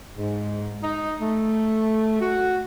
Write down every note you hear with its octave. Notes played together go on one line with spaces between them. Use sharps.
G#2
D#4
A3
F#4